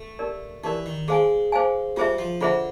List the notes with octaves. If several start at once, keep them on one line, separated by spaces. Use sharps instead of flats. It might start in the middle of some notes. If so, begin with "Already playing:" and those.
Already playing: A3
D#4 G4 A#4 D5
E3 D#4 G4 A#4 D5
D#3
G#3 G#4 C5 F5 G#5
G#4 C5 F5 G#5
G3 F4 G#4 C5 E5
F3
D3 F4 G#4 C5 E5